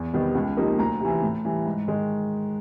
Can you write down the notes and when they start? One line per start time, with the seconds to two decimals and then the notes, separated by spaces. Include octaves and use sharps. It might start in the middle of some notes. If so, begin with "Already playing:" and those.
Already playing: E2
0.13 C3 D#3 G3 B3
0.35 C#2
0.57 C3 F3 A#3 D#4
0.79 D2 A#5
1.00 C3 E3
1.22 A2
1.45 E3 G3
1.66 G#2
1.88 D#3 G#3